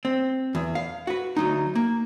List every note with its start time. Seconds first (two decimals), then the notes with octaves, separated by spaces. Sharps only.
0.05 C4
0.55 E2
0.75 F5
1.07 F#4 B4
1.37 D2 F#3 D#4
1.75 A#3